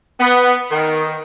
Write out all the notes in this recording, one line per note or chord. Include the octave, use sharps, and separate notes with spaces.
B3
D#3